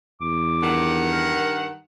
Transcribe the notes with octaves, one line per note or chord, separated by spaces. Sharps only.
E2 D6
G2 D#3 F#5
A#4